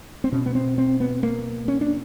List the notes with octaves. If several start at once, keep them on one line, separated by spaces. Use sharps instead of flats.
C4
B2 C#4
B3
C4
C4
B3
A#3
C#4
D4